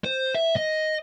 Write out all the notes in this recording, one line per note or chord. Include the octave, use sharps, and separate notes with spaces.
C5
E5
D#5